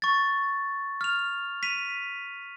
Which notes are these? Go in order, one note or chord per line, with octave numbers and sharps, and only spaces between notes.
C#6 A6
F6 F7
B6 D#7 F7